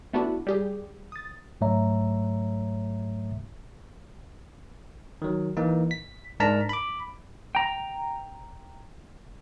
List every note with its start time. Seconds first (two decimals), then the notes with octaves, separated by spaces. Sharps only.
0.13 A3 B3 D4 E4 F#4
0.47 G3 G4 G#4
1.12 D#6 A6
1.61 G#2 F#3 A3 C#5 E5 A#5
5.22 D#3 F#3
5.57 E3 A#3 D#4
5.91 B6
6.40 G#2 D4 A#4 A5 A#5 B6
6.69 B5 D6
7.55 G5 A#5